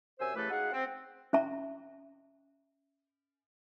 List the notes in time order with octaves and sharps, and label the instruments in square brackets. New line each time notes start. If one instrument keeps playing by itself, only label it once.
[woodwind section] F#2 C3 C5 G#5 E6
C#3 E3 A3 G4 A4 B4
D#4 F#4 G#4 F5 F#5
C4
[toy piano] C#4 E5 A#5